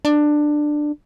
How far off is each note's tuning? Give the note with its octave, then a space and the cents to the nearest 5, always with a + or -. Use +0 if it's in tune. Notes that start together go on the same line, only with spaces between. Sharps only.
D4 +15